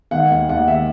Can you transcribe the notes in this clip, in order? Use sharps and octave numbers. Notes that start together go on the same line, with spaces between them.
D#3 F#5
D#2
D#2 F#5
D#3 E5